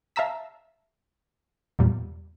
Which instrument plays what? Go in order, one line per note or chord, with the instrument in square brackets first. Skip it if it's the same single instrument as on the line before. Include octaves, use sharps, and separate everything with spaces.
[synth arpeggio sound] E5 F5 A5 A#5 E6 B6
E2 A#2 G3